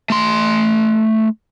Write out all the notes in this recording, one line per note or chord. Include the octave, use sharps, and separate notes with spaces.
A3 C6